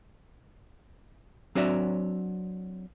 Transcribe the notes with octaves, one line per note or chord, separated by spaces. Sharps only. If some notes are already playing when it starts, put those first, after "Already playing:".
F#3 C4 D4 F#4 C#5 E5